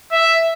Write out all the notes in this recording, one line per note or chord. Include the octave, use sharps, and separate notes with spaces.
E5